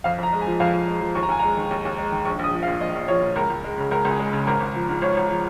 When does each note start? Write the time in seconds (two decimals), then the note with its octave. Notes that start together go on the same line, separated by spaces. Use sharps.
0.04 F2 F5
0.18 F2 A#5
0.33 G#3
0.41 G#5
0.47 F3
0.60 F2 F5
0.73 F2
0.87 G#3
1.01 F3
1.15 D#2 C#6
1.23 A#5
1.29 D#2 G#5
1.39 G#3 A#5
1.57 D#3
1.71 D#2
1.85 D#2
1.98 G#3
2.12 D#3
2.25 A#1 C#6
2.39 A#1 D#6
2.53 F3
2.63 F5
2.68 A#2
2.81 A#1 D#5
2.95 A#1
3.08 F3 C#5
3.22 A#2
3.36 C#2 A#4
3.50 C#2
3.64 G#3
3.78 C#3
3.91 C#2 A#4
4.05 C#2
4.10 G#4
4.19 G#3
4.33 C#3
4.47 G#1 A#4
4.60 G#1
4.75 F3
4.89 G#2
5.02 G#1 C#5
5.17 G#1
5.29 F3